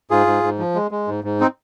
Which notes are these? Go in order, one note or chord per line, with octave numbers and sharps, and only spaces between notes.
G#2 F4 G#4
G#2
G#2
F3
G#3
G#3
G#2
G#2
C4 D#4